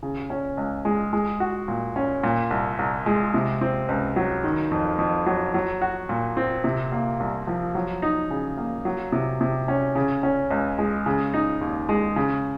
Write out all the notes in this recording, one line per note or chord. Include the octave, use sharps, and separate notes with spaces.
C#3
C#4
C#2
G#3
G#3
F#4
A#2
C#4
A#2
C2
C2
G#3
C3
C4
C#2
F#3
D#3
F2
F2
F#3
F#3
F#4
A#2
C4
C3
A#3
C2
F3
F#3
D#4
C#3
A#3
F#3
C3
C3
C#4
C#3
C#4
C#2
G#3
C#3
D#4
D#2
G#3
C#3